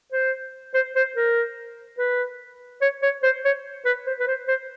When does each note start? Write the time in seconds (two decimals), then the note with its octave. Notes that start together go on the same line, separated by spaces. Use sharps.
0.12 C5
0.74 C5
0.96 C5
1.16 A#4
1.98 B4
2.82 C#5
3.03 C#5
3.23 C5
3.45 C#5
3.85 B4
4.06 C5
4.19 B4
4.28 C5
4.48 C5